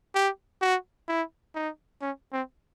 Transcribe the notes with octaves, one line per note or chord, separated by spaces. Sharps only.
G4
F#4
E4
D#4
C#4
C4